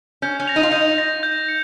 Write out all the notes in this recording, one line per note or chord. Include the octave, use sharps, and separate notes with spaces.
C#4 G6
C#4
A#6 F7
D#4
F4
D#4 G6
A#6 F7
G6
C#7